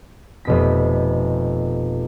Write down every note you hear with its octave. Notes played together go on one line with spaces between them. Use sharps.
F1 B2 B6